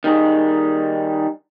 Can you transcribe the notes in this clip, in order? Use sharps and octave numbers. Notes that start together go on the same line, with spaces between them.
D#3 G3 D#4 G#4